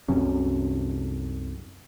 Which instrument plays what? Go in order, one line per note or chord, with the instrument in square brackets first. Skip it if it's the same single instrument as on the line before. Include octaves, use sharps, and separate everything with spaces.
[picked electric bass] C2 F#2 C3 C#4